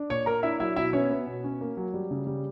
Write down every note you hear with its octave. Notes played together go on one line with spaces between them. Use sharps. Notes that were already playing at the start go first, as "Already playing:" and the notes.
Already playing: D4
A#2 C#5 C#6
A#3 A#4 A#5
D4 E4 E5
F#3 E4 E5
B2 E4 E5
B3 C#4 C#5
B3
B2
C#4
A#3
F#3
G3
C#3
G3